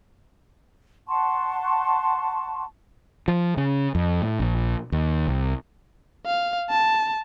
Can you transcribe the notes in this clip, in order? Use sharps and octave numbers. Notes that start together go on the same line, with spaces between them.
F#5 A5 C6 C#6
F3
C#3
F2
A2
A#1
D#2
C2
F5
A5